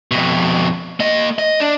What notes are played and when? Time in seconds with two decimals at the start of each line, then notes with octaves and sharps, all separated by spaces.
0.11 F2 B2
1.00 A#3 D#5
1.38 D#5
1.60 D4